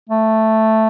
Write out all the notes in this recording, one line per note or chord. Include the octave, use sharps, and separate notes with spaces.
A3